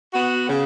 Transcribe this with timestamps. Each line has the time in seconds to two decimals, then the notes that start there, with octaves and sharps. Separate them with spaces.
0.13 B3 F#4
0.49 C#3